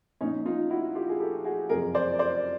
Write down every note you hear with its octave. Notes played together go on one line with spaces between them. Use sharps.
A#1 A#2 C#4 D#4
D#4 F4
E4 F#4
F4 G4
G#4
G4 A4
F#4 G#4
F#1 F2 C3 G#4 A#4
C5 D5
C5 D5